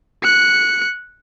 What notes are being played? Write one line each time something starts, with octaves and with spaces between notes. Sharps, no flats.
F#6 C#7